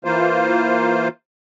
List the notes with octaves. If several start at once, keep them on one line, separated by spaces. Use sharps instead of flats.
E3 A#3 F4 C5